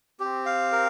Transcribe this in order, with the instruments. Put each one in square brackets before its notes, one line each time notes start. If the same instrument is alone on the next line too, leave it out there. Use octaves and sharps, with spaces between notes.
[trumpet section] C4 [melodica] G4
[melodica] F5
A#4